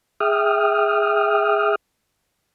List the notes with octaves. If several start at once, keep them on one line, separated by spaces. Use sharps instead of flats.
G#4 E5 G5 D#6 F6